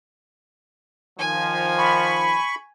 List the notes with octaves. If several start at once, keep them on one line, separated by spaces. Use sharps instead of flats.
D#3 F3 G#5
B5 C#6